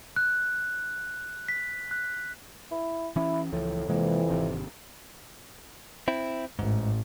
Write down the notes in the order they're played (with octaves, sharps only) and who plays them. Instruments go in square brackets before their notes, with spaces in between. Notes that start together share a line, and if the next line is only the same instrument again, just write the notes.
[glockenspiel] F#6
B6
F#6
[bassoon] E4
[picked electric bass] E3 C#4 [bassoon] E4
[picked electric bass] C#2 E3 F3 [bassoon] A2
[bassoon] F2 [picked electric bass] C3 G#3 A#3 [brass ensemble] E3
[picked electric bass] G#1 C3 D#3
[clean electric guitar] C4 E4
[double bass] A1 [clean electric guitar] G#2